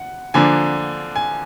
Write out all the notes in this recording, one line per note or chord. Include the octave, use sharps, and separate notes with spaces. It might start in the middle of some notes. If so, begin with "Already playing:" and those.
Already playing: F#5
D3 F3 A#3 D4 G#5
G#5